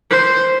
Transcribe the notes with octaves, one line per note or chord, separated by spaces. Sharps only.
C5